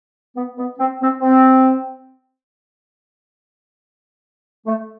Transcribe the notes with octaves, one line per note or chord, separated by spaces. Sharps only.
B3
B3
C4
C4
C4
A3